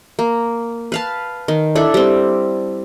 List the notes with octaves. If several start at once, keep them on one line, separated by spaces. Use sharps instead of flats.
A#3
B4 F5 A5
D#3
D4 E4 A4
G3 C4